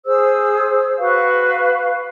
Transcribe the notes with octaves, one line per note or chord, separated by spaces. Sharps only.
G#4 C5 E6
F#4 B4 F5 C#6